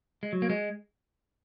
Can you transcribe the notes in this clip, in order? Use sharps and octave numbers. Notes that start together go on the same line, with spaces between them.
G#3
F#3
A#3
G#3